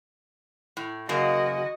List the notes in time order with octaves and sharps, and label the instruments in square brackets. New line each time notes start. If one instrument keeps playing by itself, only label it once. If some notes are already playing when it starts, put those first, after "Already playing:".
[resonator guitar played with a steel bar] A2
[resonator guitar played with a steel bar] F#2 C#3 A#3 [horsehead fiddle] F#4 D#5